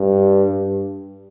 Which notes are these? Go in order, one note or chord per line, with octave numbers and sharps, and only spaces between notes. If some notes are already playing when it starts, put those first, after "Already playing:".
Already playing: G2
G2